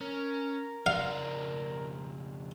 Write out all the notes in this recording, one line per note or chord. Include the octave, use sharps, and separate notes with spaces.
C#4 A#4
F2 C#3 D5 F5